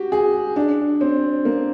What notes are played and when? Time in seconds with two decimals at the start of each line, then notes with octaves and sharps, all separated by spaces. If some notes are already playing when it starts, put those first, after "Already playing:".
Already playing: F#4 G4
0.12 G#4
0.56 D4
1.01 C4
1.45 A#3